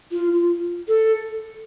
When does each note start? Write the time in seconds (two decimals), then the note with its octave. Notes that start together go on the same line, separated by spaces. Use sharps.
0.12 F4
0.34 F4
0.88 A4